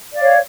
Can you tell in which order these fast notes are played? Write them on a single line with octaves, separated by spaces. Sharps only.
D5 F5 C#5